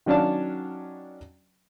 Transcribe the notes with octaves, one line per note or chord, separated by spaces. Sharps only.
D#3 F#3 C#4 D4 F5 A5